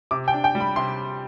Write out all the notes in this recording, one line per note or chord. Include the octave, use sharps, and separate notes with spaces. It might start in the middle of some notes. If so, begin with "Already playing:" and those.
C3 D6
G5
D4
G5
G3
B5
C3 C6